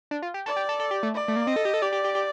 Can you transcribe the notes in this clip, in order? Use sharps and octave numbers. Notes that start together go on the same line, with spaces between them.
D4
F4
G4
A4 D5
G4
A4
A4
G4
A3
D5
A3
A#3
C4 D#5
A4
G4
A4
G4 D5
G4
G4
G4